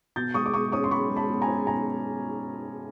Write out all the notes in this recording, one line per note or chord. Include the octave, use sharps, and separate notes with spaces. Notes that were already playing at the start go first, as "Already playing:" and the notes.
B2 G6 A6
G#3 C#6 D#6
D6
B2 C#6 D#6
C#4 C#6 D#6
C6
B2 B5 C#6
G#3
A5 B5
B2
G#5 A#5
C#4
B2 G#5 A#5